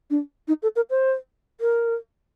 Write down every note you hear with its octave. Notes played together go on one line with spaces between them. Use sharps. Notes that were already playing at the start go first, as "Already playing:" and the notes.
D4
D#4
A4
A#4
C5
A#4